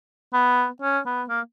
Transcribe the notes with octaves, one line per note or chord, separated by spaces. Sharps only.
B3
C#4
B3
A#3